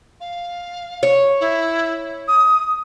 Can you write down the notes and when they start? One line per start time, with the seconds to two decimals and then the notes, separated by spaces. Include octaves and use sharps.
0.20 F5
1.03 C#5
1.40 E4
2.28 D#6